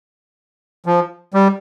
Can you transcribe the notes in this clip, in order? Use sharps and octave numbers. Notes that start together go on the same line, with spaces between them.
F3
G3